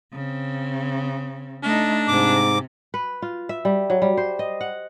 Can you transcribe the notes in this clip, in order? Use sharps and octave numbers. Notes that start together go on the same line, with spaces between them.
C#3 C4
A3 D4 D#4
G#2 C3 D6
B4
F4
E5
G3
F#3
G3
C5
D#5
F#5